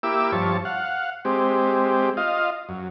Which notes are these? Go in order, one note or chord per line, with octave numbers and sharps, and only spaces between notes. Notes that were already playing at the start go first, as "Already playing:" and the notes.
A#3 E4 G4 D6 E6
G2 F3 C#5 A5
F5 F#5
G#3 C4 G4
F4 D#5 F5
F#2